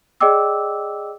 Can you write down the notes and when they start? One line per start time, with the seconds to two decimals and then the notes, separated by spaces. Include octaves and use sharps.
0.20 G#4 D5 D#5 G5 D6 E6